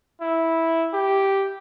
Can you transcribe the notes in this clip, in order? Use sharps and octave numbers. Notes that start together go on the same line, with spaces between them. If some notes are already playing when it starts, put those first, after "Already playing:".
E4
G4